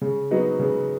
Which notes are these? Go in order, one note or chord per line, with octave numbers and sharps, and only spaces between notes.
C#3
F#3 B3 D#4 F#4
C#3